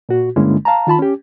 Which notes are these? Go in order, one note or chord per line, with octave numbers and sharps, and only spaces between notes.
A#2 F#4
G2 D3 G#3 A#3 C#4 E4
F5 A5 A#5
D#3 F4 A5 B5
C#4 G4